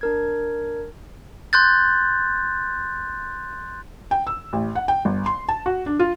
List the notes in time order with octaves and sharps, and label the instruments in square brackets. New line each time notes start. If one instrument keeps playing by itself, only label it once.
[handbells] D4 A#4 G#6
[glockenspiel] C6 F#6 G6 A6
[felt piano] G5
E6
A1
F#5
G5
G1
C6
A5
F#4
D4
F4